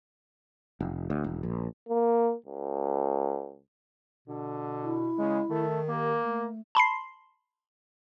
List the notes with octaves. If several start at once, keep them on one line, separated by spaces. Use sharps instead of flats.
F1
D2
E1
A#1
A#3
C#2
B2 D3
E4
C#3 G#3
D#3 A3
A#3 G4
A3
A5 B5 C6 C7